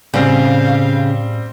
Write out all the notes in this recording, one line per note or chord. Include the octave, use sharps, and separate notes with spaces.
A2 C#3 G3 C4 F5